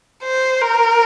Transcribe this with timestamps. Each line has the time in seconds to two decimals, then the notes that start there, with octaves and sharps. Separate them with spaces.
0.23 C5
0.61 A#4